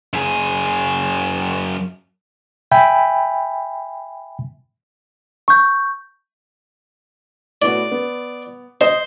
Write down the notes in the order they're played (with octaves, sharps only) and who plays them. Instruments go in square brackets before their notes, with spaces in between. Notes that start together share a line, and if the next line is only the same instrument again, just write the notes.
[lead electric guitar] F#2 G#4
[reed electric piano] E5 G5 G#5 B5
[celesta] C#6 G6
[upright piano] A2 B3 F#4 [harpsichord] D5
[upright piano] B3
[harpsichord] C5 [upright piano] D#5